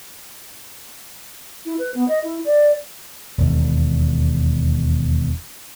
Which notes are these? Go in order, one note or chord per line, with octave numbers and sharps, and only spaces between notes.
E4
B4
B3
D#5
E4
D5
E1 D#2